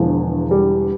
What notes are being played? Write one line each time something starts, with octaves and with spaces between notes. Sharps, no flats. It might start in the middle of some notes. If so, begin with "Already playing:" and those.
Already playing: E1 E2 D3 F3
G3